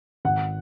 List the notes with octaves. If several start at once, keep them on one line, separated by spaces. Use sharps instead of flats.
G#1 F#5